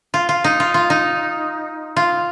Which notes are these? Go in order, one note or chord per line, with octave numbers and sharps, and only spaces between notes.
F4
F4
D#4
F4
F4
D#4
F4